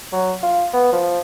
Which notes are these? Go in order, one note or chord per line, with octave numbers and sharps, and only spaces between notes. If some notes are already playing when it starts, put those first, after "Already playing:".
F#3
F4
B3
F3